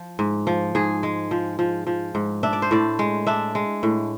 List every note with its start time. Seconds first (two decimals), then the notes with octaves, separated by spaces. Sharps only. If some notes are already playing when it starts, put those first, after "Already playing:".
Already playing: F3
0.19 G#2
0.47 F3
0.75 G#2 G#4
1.03 G#3
1.31 F3
1.59 F3
1.87 F3
2.15 G#2
2.43 D4 E5
2.53 D5
2.62 C5
2.71 A2 D5
2.99 G#3
3.27 D4 E5
3.55 G#3
3.83 A2